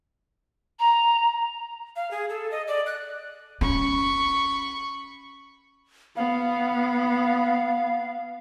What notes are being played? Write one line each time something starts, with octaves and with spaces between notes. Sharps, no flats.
A#5
F5
G#4
A4
D#5
D5
F#6
C#4 B5 C#6
B3 F5